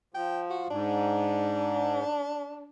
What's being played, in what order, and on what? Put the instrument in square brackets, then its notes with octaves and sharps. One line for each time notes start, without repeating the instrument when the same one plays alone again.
[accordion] F3 [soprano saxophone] G5
[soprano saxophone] F#4
[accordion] G#2 [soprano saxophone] D4